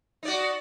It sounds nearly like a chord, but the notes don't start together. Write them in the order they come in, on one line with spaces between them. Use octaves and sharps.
D#4 D5 F#4